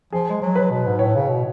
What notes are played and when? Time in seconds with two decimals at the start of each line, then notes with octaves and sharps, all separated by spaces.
0.12 F3 G#4
0.30 G#3
0.41 F#3
0.55 B4
0.70 B2
0.87 G#2
0.99 A2 C#5
1.15 C#3
1.29 B2